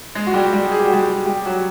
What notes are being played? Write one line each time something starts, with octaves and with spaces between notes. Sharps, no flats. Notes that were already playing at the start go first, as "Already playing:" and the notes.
G#3 G#4
F#4
G3 G4
G3 G4
G#4
G4
F#4
G3 G4
G3 G4
F#3 F#4